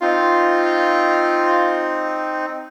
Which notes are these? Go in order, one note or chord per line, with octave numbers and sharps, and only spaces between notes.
C4 D#4 F4